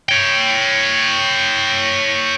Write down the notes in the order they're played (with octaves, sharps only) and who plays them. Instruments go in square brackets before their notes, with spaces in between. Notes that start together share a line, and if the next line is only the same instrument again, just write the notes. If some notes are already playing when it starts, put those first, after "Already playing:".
[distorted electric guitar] C#5 G5